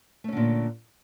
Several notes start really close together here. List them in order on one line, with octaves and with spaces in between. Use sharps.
A3 C#4 D3 A#2